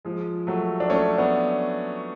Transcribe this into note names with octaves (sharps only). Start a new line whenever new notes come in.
F3 G#3
F#3 A3
D4
A3 C#4
B3 D4